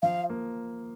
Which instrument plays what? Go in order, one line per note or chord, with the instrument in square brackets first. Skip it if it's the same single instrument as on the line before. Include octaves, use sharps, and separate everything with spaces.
[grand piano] F3 [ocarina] F5
[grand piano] A#3